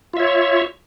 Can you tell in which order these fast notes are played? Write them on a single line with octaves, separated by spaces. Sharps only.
F4 E5 C#5